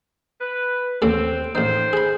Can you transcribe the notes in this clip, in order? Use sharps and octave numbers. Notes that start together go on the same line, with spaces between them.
B4
A1 D#2 A2 C4
A1 D#3 D#4 C5
G#4 B5